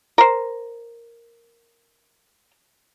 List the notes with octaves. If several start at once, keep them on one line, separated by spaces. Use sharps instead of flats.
A#4 C5